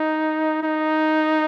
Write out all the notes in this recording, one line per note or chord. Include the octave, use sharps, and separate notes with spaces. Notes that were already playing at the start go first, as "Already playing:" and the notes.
Already playing: D#4
D#4